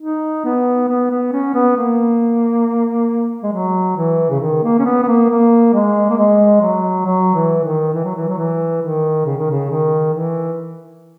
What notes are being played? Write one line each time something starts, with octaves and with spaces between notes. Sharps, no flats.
D#4
B3
B3
B3
C#4
B3
A#3
G#3
F#3
E3
C#3
D#3
A#3
C#4
B3
B3
A#3
A#3
G#3
A#3
G#3
F#3
F#3
E3
D#3
E3
F#3
E3
F#3
E3
D#3
C#3
D#3
C#3
D#3
E3